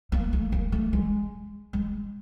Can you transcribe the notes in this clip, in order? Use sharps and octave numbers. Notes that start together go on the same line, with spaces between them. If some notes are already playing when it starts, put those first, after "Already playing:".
A#3
A3
A#3
A3
G#3
G#3